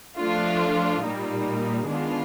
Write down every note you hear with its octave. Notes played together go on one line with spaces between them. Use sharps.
F3 A3 D4 F4
A#2 G3 A#3 D#4
D#3 G#3 B3 D4 F4